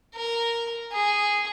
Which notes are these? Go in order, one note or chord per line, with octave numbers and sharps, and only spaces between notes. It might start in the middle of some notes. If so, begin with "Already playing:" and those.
A#4
G#4